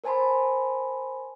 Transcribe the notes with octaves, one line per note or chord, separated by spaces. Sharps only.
A#4 C5 G#5 A5 B5 C6